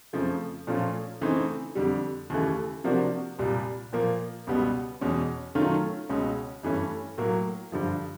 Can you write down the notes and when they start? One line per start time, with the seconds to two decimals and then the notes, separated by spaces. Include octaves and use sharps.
0.13 F2 C#3 F3 A3
0.67 A#2 F3 A3 C#4 F4
1.21 C#3 E3 A3 C4 D#4
1.75 F2 D3 G3
2.30 D#2 C#3 E3 A3
2.84 C3 F3 A#3 D4 F#4
3.39 C2 A#2 G3
3.93 A#2 F3 A#3
4.47 C#2 B2 G3 B3
5.01 E2 B2 G#3 C#4
5.55 D#3 F#3 A3 C#4 F4
6.09 C#2 B2 G#3 C#4
6.63 G2 E3 A3 C#4
7.18 A2 F#3 A#3
7.72 G2 D3 F3